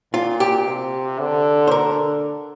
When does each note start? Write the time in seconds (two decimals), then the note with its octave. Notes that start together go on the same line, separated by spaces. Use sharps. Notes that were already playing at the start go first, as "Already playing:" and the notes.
0.13 A#2 F4
0.40 G4
0.67 C3
1.20 D3
1.67 C5
1.71 D3 A#4